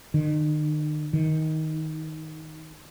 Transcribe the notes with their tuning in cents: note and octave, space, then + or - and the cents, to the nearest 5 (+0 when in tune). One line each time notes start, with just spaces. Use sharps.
D#3 -40
D#3 +15